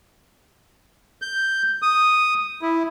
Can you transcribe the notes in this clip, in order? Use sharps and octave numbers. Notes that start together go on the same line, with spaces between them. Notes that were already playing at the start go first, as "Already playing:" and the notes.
G6
D#6
E4